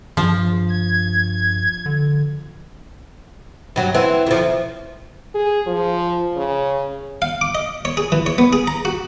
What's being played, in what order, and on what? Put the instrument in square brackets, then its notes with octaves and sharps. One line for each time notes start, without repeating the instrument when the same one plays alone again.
[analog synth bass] G2 [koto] F3
[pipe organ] G#6
[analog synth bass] D3
[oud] G2 F#3
E3 C4
F2 F3
[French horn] G#4
F3
C#3
[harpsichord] F5
D6
D#5
C#5
G#4
E3
C#5
B3
G#4
A#5
F#4